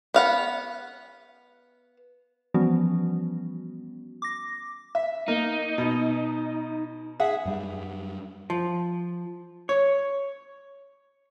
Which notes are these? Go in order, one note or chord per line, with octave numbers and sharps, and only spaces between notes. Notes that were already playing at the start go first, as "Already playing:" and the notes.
B3 F5 F#5
E3 F3 G3 B3 C#4 F#4
D6 A#6
E5
A#3 D#4
B2
G#4 E5 F#5
F#2 G3
F3
C#5